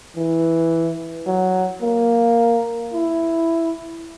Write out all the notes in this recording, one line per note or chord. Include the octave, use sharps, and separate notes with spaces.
E3
F#3
A#3
E4